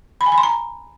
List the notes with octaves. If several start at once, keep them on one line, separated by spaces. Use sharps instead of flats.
B5
G#5
B5
C6
A#5